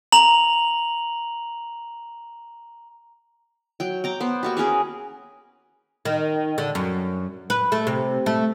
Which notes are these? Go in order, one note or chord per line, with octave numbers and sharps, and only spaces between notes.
A#5 F7 F#7
F#3 G5
G5 A#5 D6
B3 C5
A#3 F#4 G4
C#4 G#4 A#4 B4
D#3
D3
F#2
B4
A3
C3
A3